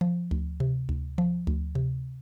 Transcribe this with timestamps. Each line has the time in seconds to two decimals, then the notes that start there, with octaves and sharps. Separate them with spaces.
0.01 F3
0.31 D2
0.60 C3
0.89 D2
1.18 F3
1.47 D2
1.75 C3